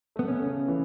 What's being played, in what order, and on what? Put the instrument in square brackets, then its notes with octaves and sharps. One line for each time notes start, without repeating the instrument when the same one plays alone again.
[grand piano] A3 [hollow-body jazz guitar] B3
[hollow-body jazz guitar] C#4
[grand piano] C#3
E3